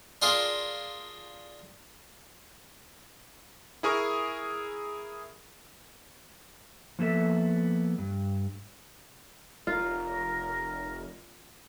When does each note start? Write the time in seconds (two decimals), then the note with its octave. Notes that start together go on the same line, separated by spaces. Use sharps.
0.22 D4 F4 G#4 A#4
3.83 E4 G#4 A#4 C#6
6.99 F3 A#3 B3 A4 E5
7.98 G2
9.67 F1 F4 A#4